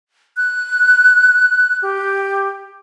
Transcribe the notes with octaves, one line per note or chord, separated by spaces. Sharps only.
F#6
G4